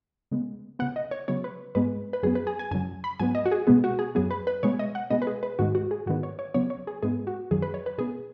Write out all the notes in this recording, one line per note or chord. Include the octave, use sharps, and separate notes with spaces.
C#3 G#3 B3
C#3 B3 F#5
D#5
C#5
C#3 F#3 B3 C#5
B4
G#2 G#3 B3 B4
B4
F#2 F#3 B3 G#4
B4
G#4
G#5
F#2 C#3 F#3 G#5
B5
G#2 F#3 B3 G#5
D#5
F#4
G#4
B2 G#3 B3 G#4
F#4
G#4
F#2 F#3 B3 G#4
B4
B4
B2 G#3 B3 C#5
D#5
F#5
B2 G#3 B3 D#5
B4
G#4
B4
G#2 D#3 G#3 F#4
F#4
G#4
G#2 D#3 B3 F#4
C#5
C#5
C#3 F#3 B3 C#5
C#5
G#4
G#2 G#3 B3 G#4
F#4
F#2 D#3 F#3 G#4
B4
C#5
B4
B2 B3 G#4